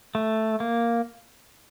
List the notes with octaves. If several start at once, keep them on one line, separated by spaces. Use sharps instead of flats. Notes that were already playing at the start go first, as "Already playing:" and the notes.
A3
A#3